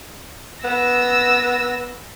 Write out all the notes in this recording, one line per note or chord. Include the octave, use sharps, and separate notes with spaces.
B3 E6 A#6